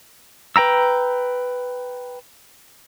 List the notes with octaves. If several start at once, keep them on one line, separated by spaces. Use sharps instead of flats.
B4 G5 A#5 E6